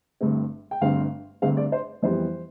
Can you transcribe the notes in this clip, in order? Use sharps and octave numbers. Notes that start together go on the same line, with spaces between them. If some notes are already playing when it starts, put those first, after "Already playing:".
G1 G2 D3 A3 C4
G5
G1 G2 D3 A3 C4 F5
G1 G2 D3 A3 C4 F5
D5
C5
F2 E3 G3 B3 C5